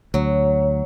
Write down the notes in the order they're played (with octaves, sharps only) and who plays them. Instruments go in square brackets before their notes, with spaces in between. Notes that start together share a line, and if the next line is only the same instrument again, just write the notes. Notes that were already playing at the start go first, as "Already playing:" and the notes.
[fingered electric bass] D2 [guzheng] F#3